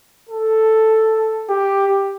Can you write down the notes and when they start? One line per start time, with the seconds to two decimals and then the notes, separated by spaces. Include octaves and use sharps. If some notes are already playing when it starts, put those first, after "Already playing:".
0.29 A4
1.49 G4